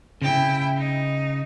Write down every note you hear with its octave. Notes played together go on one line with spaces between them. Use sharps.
C#3 E4 G5
D#4